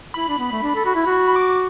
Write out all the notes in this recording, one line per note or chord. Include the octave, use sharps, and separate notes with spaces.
E4 B5
D4
B3
A3
D4
A4
F#4
E4
F#4
D6